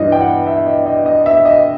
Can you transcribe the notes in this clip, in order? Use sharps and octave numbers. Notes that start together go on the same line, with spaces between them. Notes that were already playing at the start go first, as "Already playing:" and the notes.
Already playing: G2 E3 D#5
G5
F#5
E5
D#5
D#5
D#5
E5
D#5